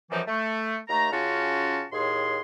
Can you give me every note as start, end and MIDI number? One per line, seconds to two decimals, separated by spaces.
0.11 0.21 42
0.11 0.21 52
0.11 0.21 53
0.11 0.21 55
0.11 0.21 63
0.28 0.78 57
0.89 1.11 39
0.89 1.11 57
0.89 1.11 82
1.12 1.85 49
1.12 1.85 61
1.12 1.85 65
1.12 1.85 66
1.12 1.85 81
1.93 2.42 39
1.93 2.42 45
1.93 2.42 68
1.93 2.42 84